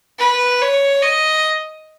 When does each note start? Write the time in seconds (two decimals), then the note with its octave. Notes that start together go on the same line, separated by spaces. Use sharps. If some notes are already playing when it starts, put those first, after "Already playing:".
0.19 B4
0.62 C#5
1.03 D#5